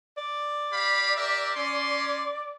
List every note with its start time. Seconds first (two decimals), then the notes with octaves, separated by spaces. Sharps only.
0.17 D5
0.71 G4 F5 B5
1.15 G4 A#4 E5
1.55 C#4 C6